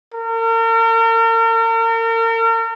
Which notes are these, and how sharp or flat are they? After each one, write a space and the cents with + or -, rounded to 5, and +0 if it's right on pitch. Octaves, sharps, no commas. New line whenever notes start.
A#4 -40